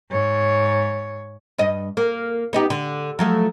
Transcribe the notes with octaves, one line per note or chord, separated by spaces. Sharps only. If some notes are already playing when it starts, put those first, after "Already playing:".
G#2 C#5
G2 D#5
A#3
B3 D#4 G4
D3
F3 F#3 A3